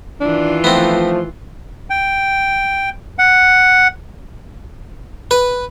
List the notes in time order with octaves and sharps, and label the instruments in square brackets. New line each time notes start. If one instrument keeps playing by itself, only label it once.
[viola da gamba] D#3 E3 F4 [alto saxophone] D4
[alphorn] F3 [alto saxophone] A3 [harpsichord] B3 C4
[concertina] G5
F#5
[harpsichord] B4